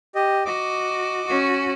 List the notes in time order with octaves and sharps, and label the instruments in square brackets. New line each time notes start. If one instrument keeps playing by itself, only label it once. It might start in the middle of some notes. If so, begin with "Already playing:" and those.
[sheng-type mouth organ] G4 D#5
[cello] F#4 [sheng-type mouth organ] D#5 D6
[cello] C#4 F#4